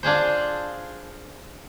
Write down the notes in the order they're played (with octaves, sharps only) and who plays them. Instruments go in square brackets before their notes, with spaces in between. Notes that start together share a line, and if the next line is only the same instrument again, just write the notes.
[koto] D4 F4 G#4 C5